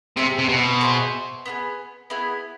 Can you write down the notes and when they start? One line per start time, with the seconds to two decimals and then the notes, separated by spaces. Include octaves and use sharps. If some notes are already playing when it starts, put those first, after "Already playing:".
0.17 C3 G#4 C5 E5
0.38 C3
0.49 B2
0.81 G#4 C5 E5
1.46 B3 E4 G#4
2.10 B3 E4 G#4